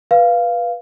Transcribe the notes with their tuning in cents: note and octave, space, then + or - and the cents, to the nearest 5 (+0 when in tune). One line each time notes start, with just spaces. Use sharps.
B4 -15 F5 -10